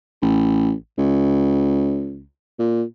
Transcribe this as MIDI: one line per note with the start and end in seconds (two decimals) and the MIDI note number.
0.22 0.73 33
0.98 2.25 37
2.59 2.83 46